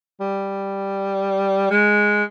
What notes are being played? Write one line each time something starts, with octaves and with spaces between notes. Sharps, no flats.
G3
G#3